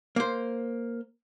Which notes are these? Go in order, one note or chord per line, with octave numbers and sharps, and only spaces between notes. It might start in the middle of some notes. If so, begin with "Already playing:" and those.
A#3 C5